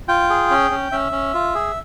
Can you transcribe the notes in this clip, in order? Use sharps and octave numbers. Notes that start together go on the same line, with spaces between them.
F4 G5
G#4
C#4
C#4
C#4 E5
C#4
F4
G#4